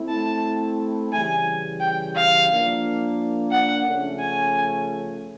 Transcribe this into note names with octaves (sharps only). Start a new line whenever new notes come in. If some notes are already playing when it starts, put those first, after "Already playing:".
Already playing: A3 C4 E4
A5
C#3 E3 G3 G#5
G5
F5
F3 A#3 D4
F#5
C#3 F3 A3 C#4
G#5